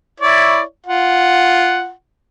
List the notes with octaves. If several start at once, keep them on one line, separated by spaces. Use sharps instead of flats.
E4 C#5 D5
F4 F#5